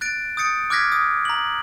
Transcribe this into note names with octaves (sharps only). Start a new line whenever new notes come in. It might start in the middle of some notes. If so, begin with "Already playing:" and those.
F#6 A6 D7
D#6 G6 A6 C#7 D7
D6 F6 F#6 G#6 A#6 B6
D#6
A#5 F#7